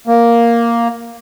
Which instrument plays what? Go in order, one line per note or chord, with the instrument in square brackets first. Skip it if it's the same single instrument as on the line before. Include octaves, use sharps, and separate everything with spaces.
[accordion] A#3